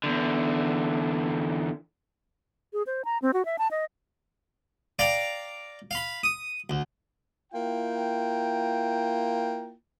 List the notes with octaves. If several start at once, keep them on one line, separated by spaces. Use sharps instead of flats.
E2 D3
G#4
C5
A#5
C4
F#4
E5
A5
D#5
D5 F5 G5 A#5
F5 B5
D#6
D2
A#3 E4 F4 G5